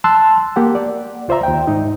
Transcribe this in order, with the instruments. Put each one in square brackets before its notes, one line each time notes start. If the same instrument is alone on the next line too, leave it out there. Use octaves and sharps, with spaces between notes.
[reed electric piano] A5 C6 E6 F#6
A#3 G4 F#5
D5
C#2 F4 C5 D5 E5 A#5
D#2 G5
G#2 D#4